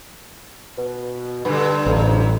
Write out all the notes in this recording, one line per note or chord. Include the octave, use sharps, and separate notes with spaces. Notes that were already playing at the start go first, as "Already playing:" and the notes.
B2
G2 D3 B3
A1 F2